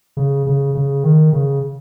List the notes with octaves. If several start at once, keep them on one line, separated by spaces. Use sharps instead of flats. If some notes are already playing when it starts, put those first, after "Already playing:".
C#3
C#3
C#3
D#3
C#3